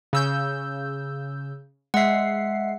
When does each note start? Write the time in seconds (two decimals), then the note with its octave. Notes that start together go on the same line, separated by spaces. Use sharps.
0.13 C#3 E6 G6
1.94 G#3 E5 F#5 C7